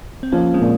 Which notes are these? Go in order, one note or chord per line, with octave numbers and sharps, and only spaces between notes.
C4
F3 A#3 C#4
G#3 C4
A#2